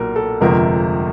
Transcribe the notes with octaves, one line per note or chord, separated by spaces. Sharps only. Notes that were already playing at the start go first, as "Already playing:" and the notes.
Already playing: B1 A#2 F#3 A#4
A4
G1 F2 C3 F3 G#3 A#4